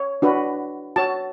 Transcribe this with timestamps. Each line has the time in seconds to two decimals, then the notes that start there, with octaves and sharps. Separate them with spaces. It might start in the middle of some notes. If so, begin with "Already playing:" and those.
Already playing: C#5
0.22 D4 F#4 B4
0.96 F#4 C#5 A5